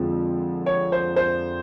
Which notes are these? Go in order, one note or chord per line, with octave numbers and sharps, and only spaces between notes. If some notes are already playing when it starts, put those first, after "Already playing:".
Already playing: F2 D3 F3 G#3
C#5
C5
C5